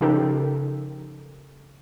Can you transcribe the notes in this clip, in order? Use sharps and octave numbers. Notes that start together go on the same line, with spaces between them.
C#3 F3 D#4 G4 A4 A#4